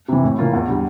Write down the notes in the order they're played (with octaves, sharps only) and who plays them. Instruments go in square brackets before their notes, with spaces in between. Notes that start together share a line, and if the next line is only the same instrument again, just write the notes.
[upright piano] C3 E3
A2
E3 A#3 F4
E2
D3 G3